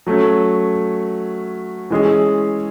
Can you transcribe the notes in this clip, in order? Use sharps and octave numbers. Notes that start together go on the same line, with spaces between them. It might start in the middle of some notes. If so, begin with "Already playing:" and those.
F#3 A3 C#4
E3 G#3 C#4 G#4